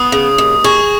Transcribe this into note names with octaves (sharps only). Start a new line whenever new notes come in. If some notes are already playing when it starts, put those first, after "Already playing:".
Already playing: B3 D#6
C#3
D#2
G#4 C#6